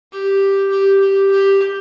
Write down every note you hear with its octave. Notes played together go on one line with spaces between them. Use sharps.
G4
G4
G4
G4